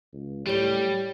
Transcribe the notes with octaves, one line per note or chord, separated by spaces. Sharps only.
C#2
A2 G3 G4 C#5 G7